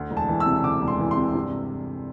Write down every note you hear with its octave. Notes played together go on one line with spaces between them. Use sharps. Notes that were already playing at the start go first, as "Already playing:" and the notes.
Already playing: D2
E1
A5
E3
E6
C3
D2 D6
E1
C6
E3
C6
C3
G2